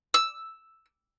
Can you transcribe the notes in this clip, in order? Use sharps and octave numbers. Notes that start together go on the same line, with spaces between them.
E6